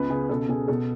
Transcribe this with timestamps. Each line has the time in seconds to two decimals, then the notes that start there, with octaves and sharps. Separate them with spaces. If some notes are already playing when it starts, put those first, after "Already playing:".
Already playing: C#2 B3 B4
0.09 C#3 G#4
0.29 B2 A4
0.49 B2 G#4
0.68 B2 A4